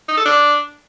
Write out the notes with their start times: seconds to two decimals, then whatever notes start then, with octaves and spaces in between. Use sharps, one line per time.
0.09 D#4
0.17 A4
0.25 D4